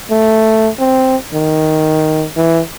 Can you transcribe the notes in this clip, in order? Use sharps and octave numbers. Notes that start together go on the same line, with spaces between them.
A3
C4
D#3
E3